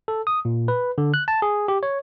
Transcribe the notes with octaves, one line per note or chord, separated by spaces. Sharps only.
A4
D#6
A#2
B4
D3
F#6
A5
G#4
G4
C#5